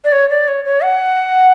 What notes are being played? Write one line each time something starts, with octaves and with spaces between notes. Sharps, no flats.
D5
C#5
D5
C#5
C#5
F#5